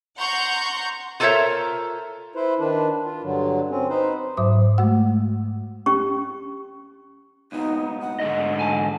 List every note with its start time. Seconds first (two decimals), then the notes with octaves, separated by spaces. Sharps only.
0.17 F#5 A#5 C6 C#6 G6
1.20 F4 A4 A#4 C5 C#5 E5
2.35 E4 B4 C5
2.59 D#3 D4 B4
3.05 F4
3.23 G2 D3 F#3
3.70 C4 C#4
3.89 D#4 B4 C5
4.37 G#2 F#3 C5 E5 D6 D#6
4.78 G#3 A3 F#4 F#5 E6
5.86 C#4 G4 C#6
7.52 C#2 B2 B3 D#4
8.01 F#5
8.20 G#2 D3 D#5
8.59 G#5 A5